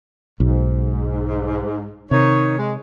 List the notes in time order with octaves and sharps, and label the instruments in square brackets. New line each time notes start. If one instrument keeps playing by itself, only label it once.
[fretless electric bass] B1 [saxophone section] G#2
[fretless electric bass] C3 [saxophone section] D#3 D#4 C#5
[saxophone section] G#3